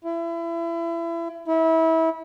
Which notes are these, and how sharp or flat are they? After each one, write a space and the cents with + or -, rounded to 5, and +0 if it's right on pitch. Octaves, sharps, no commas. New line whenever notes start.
E4 +30
E4 -25